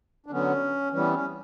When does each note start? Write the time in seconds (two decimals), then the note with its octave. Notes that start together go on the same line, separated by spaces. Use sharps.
0.26 D4
0.30 D3 F#3 B3 C#4
0.92 E3 G3 B3 C#4
1.10 C4
1.13 C#4